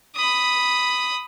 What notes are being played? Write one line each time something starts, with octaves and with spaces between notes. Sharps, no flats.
B5 D#6